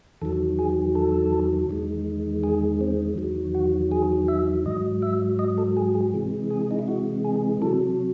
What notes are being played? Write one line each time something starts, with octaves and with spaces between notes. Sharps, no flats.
E2 D#3 F#3 A4
G#4
A4
E2 D#3 G#3
G#4
C4
E2 D#3 F#3
F#4
G#4
E5
G#2 F#3 D#5
E5
D#5
A4
G#4
G#4
C3 E3 G#3
G#4
D#4
E4
F#4
G#4
C3 F#3 A4